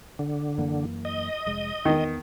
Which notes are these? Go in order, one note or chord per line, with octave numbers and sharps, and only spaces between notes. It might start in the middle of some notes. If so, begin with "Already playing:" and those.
D3
F#2 E3 A#3
D#5
F1 G#3
E2 D#3 B3